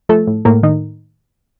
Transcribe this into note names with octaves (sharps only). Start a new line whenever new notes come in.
F3 A3 A4
A2
A2 A#3 A#4
A2 D#3 D#4